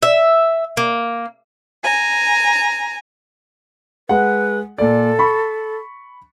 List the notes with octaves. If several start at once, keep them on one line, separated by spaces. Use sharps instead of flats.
E5
A#3
G#5 A#5
G#3 B4 F#5
A#2 A4 D5
B5 C#6